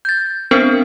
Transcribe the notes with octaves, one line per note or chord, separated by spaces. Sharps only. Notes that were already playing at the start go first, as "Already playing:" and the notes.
G6 A6
B3 C4 D4 A#4 C5 G5